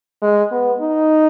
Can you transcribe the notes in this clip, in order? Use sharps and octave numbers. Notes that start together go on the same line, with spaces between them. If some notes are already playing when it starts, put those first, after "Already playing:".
G#3
B3
D#4